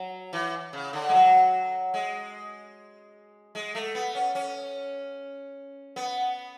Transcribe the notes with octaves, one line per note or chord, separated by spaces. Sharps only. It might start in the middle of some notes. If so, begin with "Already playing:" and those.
Already playing: F#3
E3
C#3
D3
G#3
F#3
G#3
G#3
A3
B3
C#4
C#4
B3